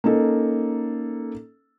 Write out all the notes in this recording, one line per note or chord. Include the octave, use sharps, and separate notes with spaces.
A#3 C#4 D#4 A4